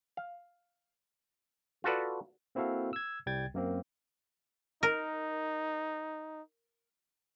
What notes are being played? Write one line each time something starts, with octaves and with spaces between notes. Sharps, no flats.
F5
F4 F#4 A4 B4 D5
A#3 C4 E4 F#4 A4 F5
E6 G#6
C2 G3 G5 G#6 A6
F#2 A#3 C4
D#4 A#4